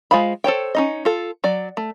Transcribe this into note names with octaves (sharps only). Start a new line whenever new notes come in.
G#3 F4 C5 F5 B5
A4 C5 C#5 G5
C#4 D#4 D#5
F4 A4
F#3 D5
A3